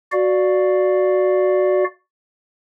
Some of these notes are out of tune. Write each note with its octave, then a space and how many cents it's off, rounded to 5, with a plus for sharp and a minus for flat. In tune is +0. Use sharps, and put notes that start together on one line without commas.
F#4 +0 D5 +0 F5 +0